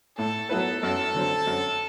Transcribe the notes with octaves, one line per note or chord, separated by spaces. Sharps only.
A2 A4
F#3 B3 E4 A4 B4
F#2 A4
D3 F#3 C4
F#2